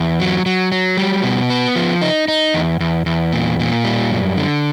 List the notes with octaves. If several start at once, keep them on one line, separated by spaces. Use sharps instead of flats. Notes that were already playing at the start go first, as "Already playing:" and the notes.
Already playing: E2
F#3
F#3
F#3
G3
B2
B3
F3
D#4
D#4
E2
E2
E2
A#2
A#2
G3
F#2
D3